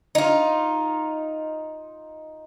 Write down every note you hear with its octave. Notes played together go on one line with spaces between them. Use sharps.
D#4 F4